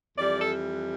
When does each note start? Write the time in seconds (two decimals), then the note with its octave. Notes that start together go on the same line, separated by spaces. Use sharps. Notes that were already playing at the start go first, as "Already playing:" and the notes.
0.17 F2 E3 G3 D5
0.40 A4